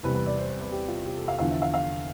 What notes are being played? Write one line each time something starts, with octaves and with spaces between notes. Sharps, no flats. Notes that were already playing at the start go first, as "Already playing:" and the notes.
E2 C3 G3 B4
B4
D5
C5
C5
B4
G4
F4
G4
A4
F5
E2 D3 F3 F5
E5
F5
F5